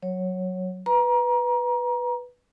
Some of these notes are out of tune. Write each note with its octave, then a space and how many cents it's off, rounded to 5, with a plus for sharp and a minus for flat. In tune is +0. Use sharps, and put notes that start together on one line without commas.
F#3 +0 C#5 -10
B4 +0 A#5 +25